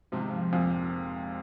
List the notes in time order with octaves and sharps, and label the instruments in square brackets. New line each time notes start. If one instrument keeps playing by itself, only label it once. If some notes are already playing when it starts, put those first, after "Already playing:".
[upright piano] G#2 C3 [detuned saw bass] F3
[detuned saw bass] D#3
F3
[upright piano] F2 A#2